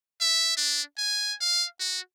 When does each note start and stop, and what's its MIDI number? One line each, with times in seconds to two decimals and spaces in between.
0.21 0.53 76
0.57 0.82 62
0.97 1.34 80
1.41 1.66 77
1.80 2.00 66